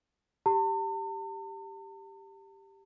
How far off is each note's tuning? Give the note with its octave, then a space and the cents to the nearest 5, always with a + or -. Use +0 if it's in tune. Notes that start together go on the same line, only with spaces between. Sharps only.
G4 +0 A5 +45